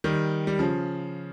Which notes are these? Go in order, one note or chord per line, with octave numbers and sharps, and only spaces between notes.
D#3 G3
G3
C#3 F3